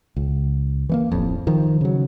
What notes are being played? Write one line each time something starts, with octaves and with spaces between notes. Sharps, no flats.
C#2
E3 A3 A#3
D1 A1 F2
D#3 F3
C#3 F#3